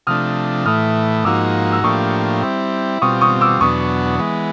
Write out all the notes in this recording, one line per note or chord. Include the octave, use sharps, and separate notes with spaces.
C3 F3 A3 D4 D#6 F6
A2 E3 A3 D#6 F6
G#2 F3 A#3 D#4 F#4 D6 E6
E6
A2 F3 A#3 D4 G4 C#6 D#6
G3 C4 E4
B2 G3 C4 F4 C#6 D#6
C#6 D#6
D6 E6
E2 B2 F#3 B3 D4 C#6 D#6
E3 G#3 B3